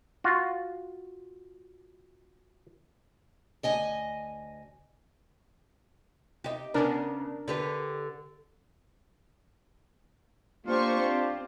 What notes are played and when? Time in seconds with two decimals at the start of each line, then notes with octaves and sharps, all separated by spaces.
0.24 F4 F#4
3.63 D2 D#5 G#5
6.44 D#4 G4
6.74 C#3 B3 D4 A#4
7.48 D3 G4 B4
10.67 A#3 D4 F4 G4 C5 C#6
10.99 C4